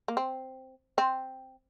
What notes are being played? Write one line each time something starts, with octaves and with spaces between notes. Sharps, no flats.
A#3
C4
C4